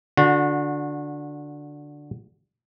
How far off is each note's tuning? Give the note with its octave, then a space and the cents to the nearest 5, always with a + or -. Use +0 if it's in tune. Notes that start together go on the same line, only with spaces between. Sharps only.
D3 +0 F#4 -30